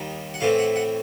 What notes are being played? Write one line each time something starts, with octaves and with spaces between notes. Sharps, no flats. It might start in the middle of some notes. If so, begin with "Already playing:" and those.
Already playing: D#2 D#3 G3
F#5
A2 E3 A3 C4 F5
F#5
F#5